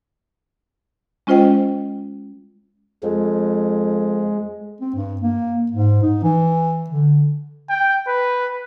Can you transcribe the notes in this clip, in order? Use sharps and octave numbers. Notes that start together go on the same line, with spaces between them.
G#3 C#4 F4 C5 D#5 G5
F2 G#3
C4
G2
A#3
G#2
D#4
E3
D3
G5
B4